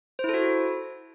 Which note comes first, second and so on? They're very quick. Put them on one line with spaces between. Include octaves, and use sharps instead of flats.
C5 E4 A4 F#4